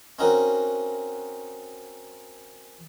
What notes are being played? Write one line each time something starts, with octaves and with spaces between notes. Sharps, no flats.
C4 C#4 D#4 F#4 A#4